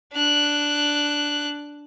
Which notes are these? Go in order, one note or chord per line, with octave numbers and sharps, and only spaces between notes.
D4 F#6